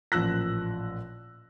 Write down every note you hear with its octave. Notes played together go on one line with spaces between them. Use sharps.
A1 A#2 F3 E6 F#6 A#6